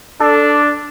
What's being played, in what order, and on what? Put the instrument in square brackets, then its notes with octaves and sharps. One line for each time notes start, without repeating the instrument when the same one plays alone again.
[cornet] D4 [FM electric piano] A4